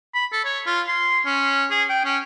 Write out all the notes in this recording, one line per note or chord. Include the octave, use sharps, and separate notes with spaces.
B5
A4
C#5
F4
C6
C#4
G#4
G5
C#4